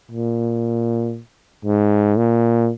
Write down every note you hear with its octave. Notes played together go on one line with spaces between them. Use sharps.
A#2
G#2
A#2